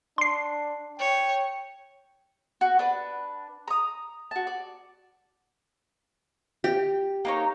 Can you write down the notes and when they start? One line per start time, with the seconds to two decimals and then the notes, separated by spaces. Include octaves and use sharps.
0.18 D4 C6 C7
0.99 C#5 G5
2.61 F#4
2.79 D4 B4
3.68 A#5 D#6
4.31 F#4 A5
4.47 D5
6.64 G4
7.25 A#3 D#4 C#5